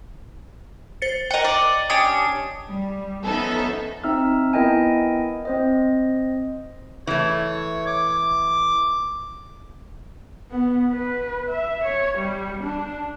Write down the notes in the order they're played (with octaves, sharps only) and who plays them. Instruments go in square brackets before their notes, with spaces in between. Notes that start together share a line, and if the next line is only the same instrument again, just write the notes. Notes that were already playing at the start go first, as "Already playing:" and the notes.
[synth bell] C5 A6 C#7
[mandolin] A#4 F#5 [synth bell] D#5 G5
[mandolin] D5
[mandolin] C#4 D4 G4 [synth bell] D#6
[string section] G3
F3 B3 C#4 D#4 A4 E5
[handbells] C4 D#4 E5 E6 F6
B3 E4 A#4 D#5 G5 G#5
C4 C5 D#5
[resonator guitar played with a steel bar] E3 A3 [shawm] C#5
[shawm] D6
[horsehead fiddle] B3
B4
E5
C#5
G3
D4